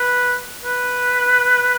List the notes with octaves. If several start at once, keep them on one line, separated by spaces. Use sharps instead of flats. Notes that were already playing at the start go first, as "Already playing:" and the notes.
Already playing: B4
B4